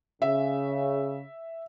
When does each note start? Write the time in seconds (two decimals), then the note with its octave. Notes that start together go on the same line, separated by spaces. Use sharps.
0.22 C#3 E5